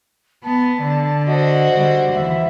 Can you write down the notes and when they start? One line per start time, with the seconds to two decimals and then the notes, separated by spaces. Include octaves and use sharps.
0.44 B3 A5
0.82 D3
1.27 F#4 C5 D#5
1.73 D3 G3
2.14 D#2 E3 E5